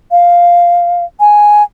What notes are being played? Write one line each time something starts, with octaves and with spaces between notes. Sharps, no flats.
F5
G#5